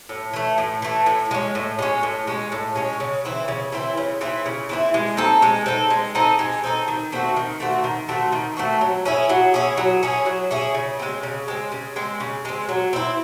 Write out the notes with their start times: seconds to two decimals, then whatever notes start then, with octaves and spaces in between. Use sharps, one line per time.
0.09 A2
0.33 E3 A3
0.58 A2
0.82 E3 A3
1.06 A2
1.31 G#3 C#4
1.55 A2
1.79 G#3 C#4
2.03 A2
2.27 G#3 C#4
2.52 A2
2.76 G#3 C#4
3.00 C#3
3.25 E3 C4 E4
3.48 C#3
3.72 E3 C4 E4
3.97 C#3
4.21 E3 C4 E4
4.46 C#3
4.69 E3 C4 E4
4.94 G#3
5.17 C4 D#4 A4
5.42 G#3
5.66 C4 D#4 A4
5.90 G#3
6.15 C4 D#4 A4
6.39 G#3
6.64 C4 D#4 A4
6.88 D#3
7.12 A3 C4 F#4
7.36 D#3
7.60 A3 C4 F#4
7.84 D#3
8.09 A3 C4 F#4
8.32 D#3
8.57 A3 C4 F#4
8.81 F#3
9.05 C#4 E4 G#4
9.29 F#3
9.54 C#4 E4 G#4
9.77 F#3
10.03 C#4 E4 G#4
10.26 F#3
10.51 C#4 E4 G#4
10.74 C#3
10.99 G#3 C4
11.23 C#3
11.48 G#3 C4
11.72 C#3
11.96 G#3 C4
12.20 C#3
12.45 G#3 C4
12.69 F#3
12.93 C4 E4